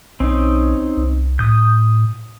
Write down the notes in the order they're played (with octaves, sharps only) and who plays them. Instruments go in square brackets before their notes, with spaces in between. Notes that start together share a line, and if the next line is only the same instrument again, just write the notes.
[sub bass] B1 [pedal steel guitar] C4 C#4 D#4
[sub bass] C2
[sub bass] A2 [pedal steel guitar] D#6 G6